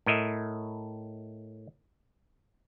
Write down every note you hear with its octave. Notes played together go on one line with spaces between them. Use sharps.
A2 A#4 D#5 E5